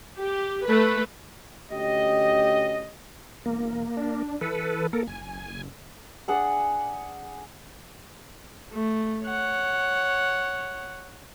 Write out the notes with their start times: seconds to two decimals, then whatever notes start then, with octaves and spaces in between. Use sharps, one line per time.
0.18 G4
0.67 A3 B4
1.71 D2 C#4 G4 D#5
3.46 E1 A#3
3.97 D4
4.41 E3 A4 B4
4.93 A#3 A4 A#4
5.07 F#1 G#5
6.28 D4 G#4 F#5 A5
8.74 A3
9.25 C#5 F#5